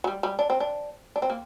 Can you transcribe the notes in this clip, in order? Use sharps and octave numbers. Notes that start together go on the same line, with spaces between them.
F#3
G3
G3
D4
C4
D4
D4
C4
A#3